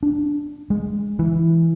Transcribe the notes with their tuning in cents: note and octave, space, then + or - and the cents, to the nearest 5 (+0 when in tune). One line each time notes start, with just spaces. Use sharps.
D4 +0
G#3 -15
E3 +5